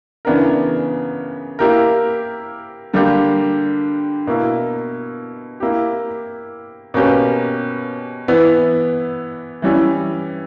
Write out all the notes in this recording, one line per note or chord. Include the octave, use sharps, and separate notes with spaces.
C#3 E3 B3 D4 A#4
A#3 E4 G4 A#4
D3 G3 A#3 D4 G4
B2 A#3 E4
A#3 E4 G4
B2 A#3 C#4 G4 B4
E3 B3 E4 B4
E3 G3 C#4 E4